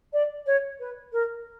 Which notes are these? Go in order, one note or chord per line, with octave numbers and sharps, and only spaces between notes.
D5
C#5
B4
A#4